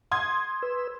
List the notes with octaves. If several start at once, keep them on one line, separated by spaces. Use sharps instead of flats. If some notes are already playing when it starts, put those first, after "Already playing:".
C6 D#6 G#6
B4 E6